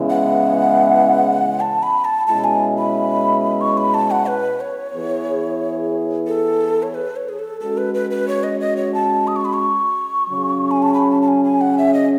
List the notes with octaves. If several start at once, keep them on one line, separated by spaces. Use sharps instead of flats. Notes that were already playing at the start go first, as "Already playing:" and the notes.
Already playing: C#3 E3 G#3 B3 E4
F#5
A5
B5
A5
B2 G#3 C#4 E4 A5
G#5
B5
C#6
B5
A5
F#5
B4
C#5
E3 B3 E4 G#4
A4
C#5
B4
C#5
G#4
A4
G#3 C#4 F#4 A4
B4
B4
B4
C#5
D#5
D#5
C#5
A5
D#6
C#6
B5
C#6
C#3 F#3 C#4 G#4
G#5
A5
B5
A5
A5
G#5
G#5
F#5
E5
D#5